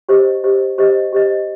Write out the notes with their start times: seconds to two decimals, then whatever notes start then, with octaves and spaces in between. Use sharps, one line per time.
0.09 G4 C5 D#5
0.44 G4 C5 D#5
0.78 G4 C5 D#5
1.12 G4 C5 D#5